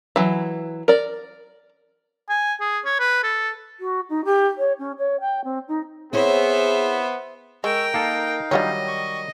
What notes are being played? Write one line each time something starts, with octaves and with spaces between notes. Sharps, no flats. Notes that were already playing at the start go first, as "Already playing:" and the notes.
E3 F#3
A#4 D5
G#5
G#4
C#5
B4
A4
F#4
D#4
G4
C#5
C#4
C#5
G5
C4
D#4
B3 C4 E4 G#4 C5 C#5 E5
G#3 A#4 G5 C#6 E6
A#3 D#4 A4 F5
D#3 F#3 G3 D4 F4 C#5 D#5
C#6